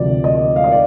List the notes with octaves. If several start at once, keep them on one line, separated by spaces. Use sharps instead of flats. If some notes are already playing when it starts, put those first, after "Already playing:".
Already playing: D2 C3 F3 D5
D#5
F5
D#5
D5